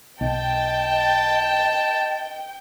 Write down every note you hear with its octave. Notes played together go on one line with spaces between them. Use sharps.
B1 D#5 G5 A5